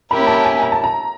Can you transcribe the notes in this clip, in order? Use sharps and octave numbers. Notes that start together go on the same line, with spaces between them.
A#3 C#4 E4 G4 A#4 B5
A5
G#5
A#5
A5
A#5